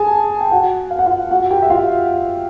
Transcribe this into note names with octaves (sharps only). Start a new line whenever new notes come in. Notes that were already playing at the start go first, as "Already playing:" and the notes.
Already playing: G#4 G#5 A5
G5
F#4 F#5
F5
F#5
F4 F5
F#4 F#5
G4 G5
E5
F4 F5